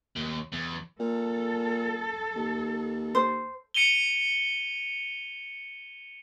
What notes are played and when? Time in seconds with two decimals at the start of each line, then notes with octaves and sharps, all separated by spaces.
0.16 D#2
0.52 E2
1.00 A#2 A4
2.35 D#2
3.15 C5
3.74 C#7 D#7 F7 G7